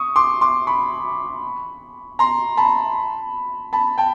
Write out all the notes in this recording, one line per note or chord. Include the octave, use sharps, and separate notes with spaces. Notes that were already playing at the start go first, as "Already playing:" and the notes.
Already playing: C#6 D#6
C6 D6
C6 D6
B5 C#6
A#5 C6
A5 B5
A5 B5
G5 A5